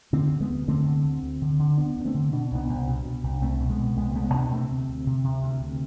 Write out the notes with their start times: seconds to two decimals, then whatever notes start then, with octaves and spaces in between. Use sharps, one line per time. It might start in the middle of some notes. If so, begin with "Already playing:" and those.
0.13 D3 A3 C4
0.32 D2
0.40 G#3 B3
0.50 D2
0.68 D3 A3 C4
0.86 D3
1.04 D2
1.23 D2
1.42 D3
1.59 D3
1.78 D2 B3 D4
1.96 D2
2.05 A3 C4
2.14 D3
2.32 B2 D4
2.51 C2 B3 D4
2.69 C2
2.87 B2
3.06 B2
3.24 C2
3.42 C2 A3 C4
3.60 B2
3.70 G#3 B3
3.79 B2
3.97 C2 G#3 B3
4.11 A3
4.15 C2 G#3 B3
4.34 B2 B3 D4
4.51 C3 A3 C4
4.70 D2
4.88 D2
5.07 C3
5.24 C3
5.43 D2
5.61 D2